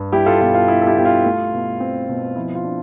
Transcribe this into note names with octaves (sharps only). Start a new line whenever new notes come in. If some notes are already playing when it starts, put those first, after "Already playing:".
Already playing: G2
G3 E4 G4
F4 A4
B2 F4
F4
D4 E4
A4
E4 G4
B2 G4
F4
A3
B2
C4
B2
F3 E4
F4
D4